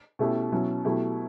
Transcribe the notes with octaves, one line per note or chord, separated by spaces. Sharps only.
B2 A3 C#4 E4 G4
B2 F#3 C#4 E4
B2 F#3 A3 E4 G4